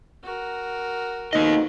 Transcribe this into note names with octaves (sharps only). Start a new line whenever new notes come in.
F#4 A#4
F2 B2 A#3 D#4 D#5